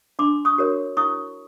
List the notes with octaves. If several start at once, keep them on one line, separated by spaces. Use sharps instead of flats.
D4 C6 D6
C#6 D#6
F#4 A#4 C#5
E4 C#6 D#6